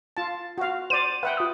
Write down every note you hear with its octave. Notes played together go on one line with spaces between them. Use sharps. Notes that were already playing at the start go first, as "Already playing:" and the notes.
F4 A5
F#4 F5
C5 D5 D#7
B4 E5 F#5 G5
F4 D#6